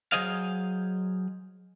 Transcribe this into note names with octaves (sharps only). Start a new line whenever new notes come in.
F#3 G#4 C5 D#5 F5